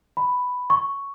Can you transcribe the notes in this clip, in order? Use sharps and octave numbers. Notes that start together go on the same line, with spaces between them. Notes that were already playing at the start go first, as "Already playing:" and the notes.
B5
C#6